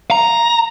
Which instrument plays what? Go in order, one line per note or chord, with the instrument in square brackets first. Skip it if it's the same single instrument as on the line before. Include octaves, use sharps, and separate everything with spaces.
[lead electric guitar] A#5